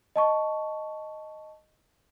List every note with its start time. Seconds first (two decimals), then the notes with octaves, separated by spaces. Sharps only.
0.16 D#5 A5 C#6